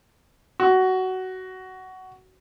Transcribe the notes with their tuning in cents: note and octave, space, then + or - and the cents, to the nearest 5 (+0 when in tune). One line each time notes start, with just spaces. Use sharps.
F#4 +15